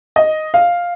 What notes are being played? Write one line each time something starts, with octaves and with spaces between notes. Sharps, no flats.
D#5
F5